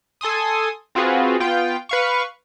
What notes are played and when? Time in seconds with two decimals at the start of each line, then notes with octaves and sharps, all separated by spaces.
0.21 A4 G#5 C6 D#6
0.95 C4 F4 F#4 G#4 B4
1.40 B3 F4 G5
1.89 B4 F5 C#6